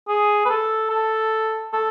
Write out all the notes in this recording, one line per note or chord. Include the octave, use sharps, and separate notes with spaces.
G#4
B4
A4
A4
A4